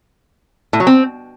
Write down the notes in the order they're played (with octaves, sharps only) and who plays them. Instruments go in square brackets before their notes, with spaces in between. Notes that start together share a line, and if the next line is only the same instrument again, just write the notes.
[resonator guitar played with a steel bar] A2
F#3
C4